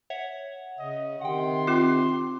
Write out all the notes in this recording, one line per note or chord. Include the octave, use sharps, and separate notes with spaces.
C#5 E5 F#5
C#3 D#5
C3 D#3 F#5 G5 C6
C4 F4 D6